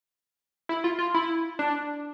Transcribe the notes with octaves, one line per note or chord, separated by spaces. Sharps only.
E4
F4
F4
E4
D4